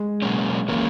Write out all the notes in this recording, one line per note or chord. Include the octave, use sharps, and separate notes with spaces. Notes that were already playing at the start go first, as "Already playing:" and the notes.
Already playing: G#3
B2 F#3 A#3 C#4
E3 G#3 A#3 C#4